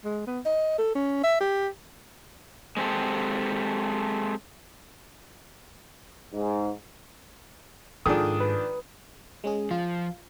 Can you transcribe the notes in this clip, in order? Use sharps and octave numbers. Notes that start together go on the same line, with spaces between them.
G#3
B3
D#5
A4
C#4
E5
G4
G#3 C4 G4 A4
G#2
G#2 D#3 F3 D4 G#4 A4 D#6
B4
G#3 C#4 G#4
F3 F4